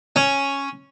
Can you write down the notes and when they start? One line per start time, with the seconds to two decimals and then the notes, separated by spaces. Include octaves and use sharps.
0.16 C#4